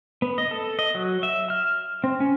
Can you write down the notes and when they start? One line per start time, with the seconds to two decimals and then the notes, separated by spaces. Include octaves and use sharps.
0.22 B3
0.38 D#5
0.51 A4
0.79 D#5
0.95 F#3
1.23 E5
1.50 F6
2.04 C4
2.20 C#4